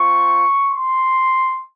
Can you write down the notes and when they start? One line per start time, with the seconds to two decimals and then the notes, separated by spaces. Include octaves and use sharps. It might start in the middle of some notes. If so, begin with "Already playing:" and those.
Already playing: C4 F4 C#6
0.71 C6